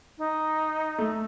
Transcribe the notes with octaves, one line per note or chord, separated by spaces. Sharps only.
D#4
A3